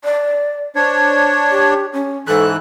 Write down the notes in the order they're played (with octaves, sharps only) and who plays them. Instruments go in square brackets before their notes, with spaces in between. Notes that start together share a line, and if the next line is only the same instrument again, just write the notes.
[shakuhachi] D5
[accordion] D4 C#5 [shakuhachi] C5
[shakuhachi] G4
C#4
[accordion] G#2 E3 F#6 [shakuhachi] A4